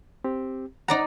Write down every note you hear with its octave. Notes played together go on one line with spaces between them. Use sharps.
C4 G4
D#4 D5 F#5 A#5